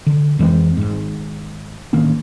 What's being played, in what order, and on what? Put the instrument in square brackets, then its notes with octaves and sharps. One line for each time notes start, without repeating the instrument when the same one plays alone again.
[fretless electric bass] D3
F2 E3 G#3 C4
G#1 G#2
A1 D#3 A#3 D4